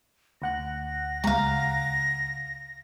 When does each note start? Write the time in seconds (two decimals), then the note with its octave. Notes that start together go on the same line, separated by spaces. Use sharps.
0.42 D2 F#5 F#6 A#6
1.24 C#2 G#3 F5 A#5